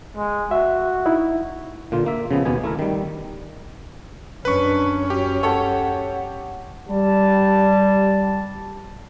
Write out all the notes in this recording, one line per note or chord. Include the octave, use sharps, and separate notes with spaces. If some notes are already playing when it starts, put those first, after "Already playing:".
G#3
F#4 E5
D#4 E4
A#2 D3 F4
A#3 E5
C#3 F3 B3
D#2 B2 B3 G#5
A3 E4 A#4
D#3 G3
F#2 C#4 D4 B4 C#6
F#4 G4
A4 C#5 F#5
G3 A5